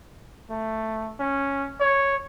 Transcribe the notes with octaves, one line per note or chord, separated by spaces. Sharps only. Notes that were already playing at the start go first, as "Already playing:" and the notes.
A3
C#4
C#5